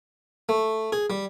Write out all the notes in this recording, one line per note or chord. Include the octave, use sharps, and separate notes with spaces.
A3
G#4
G3